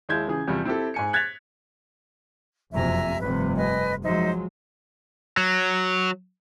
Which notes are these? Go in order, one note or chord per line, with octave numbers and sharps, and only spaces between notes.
D#2 G#3 E4 G6 G#6
C#3 E3 G#4
E2 C3 F3 G3
C4 E4 G4 A4
G#2 G#5 C#7
F#6 G#6 A6 B6 F7
F#1 F2 C3 E5 G#5 A#5
F1 G2 C3 B4
B4 D#5 G#5
F3 F#3 G#3 D#4 C5 E5
F#3